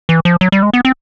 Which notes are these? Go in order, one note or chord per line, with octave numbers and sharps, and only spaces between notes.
E3
F3
F#3
G3
G#3
B3
C4